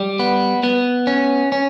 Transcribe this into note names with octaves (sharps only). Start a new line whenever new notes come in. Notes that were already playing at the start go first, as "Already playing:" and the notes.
Already playing: G3
B3
B3
C#4
C#4